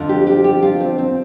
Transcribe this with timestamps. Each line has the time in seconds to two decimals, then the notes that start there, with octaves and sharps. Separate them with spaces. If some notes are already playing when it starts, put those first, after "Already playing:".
Already playing: F2 D3 F3
0.09 G4
0.27 G4
0.44 G4
0.62 F4
0.80 C4
0.98 C4